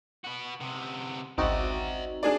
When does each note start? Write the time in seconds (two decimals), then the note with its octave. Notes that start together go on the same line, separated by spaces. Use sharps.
0.24 B3 F#4
0.60 C3 B3
1.38 G#1 C#2 C4 D#4 F#4 D5 E5
2.23 D4 G#4 D5